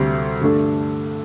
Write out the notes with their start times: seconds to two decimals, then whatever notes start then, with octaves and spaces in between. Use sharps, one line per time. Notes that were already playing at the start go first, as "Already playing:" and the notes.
Already playing: D2 C3 G3 C4
0.41 G2 D3 A3 D4 A4